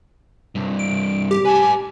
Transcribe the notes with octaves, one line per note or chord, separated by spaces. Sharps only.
C2 G2
D7
G4
B4 G#5 A5